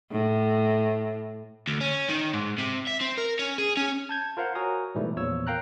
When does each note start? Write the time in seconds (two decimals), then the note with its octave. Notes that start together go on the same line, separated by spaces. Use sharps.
0.11 A2
1.67 D2
1.81 C#4
2.09 D#3
2.33 G#2
2.58 C3
2.87 E5
3.01 C4
3.18 A#4
3.39 C#4
3.58 G#4
3.77 C#4
4.09 A5 G6 G#6
4.37 F4 A#4 C5 F5 F#5
4.55 F#4 A#4 C#5 G#5 A#5 D#6
4.95 G#2 B2 E3 G3 A3
5.16 E2 A#2 F3 C#5 E6
5.47 A#4 F5 G5 A#5 F#6